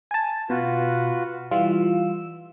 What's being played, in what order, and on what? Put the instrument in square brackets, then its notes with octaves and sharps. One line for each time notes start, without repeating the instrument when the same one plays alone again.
[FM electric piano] G#5 A5
[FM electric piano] B2 [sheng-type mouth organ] F4 F#4 B4
[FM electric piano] E3 G3 F4 [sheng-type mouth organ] E6